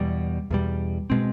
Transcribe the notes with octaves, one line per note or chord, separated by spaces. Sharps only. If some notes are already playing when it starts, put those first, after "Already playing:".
Already playing: E2 B2 G3
E2 B2 G3
B2 G#3 C4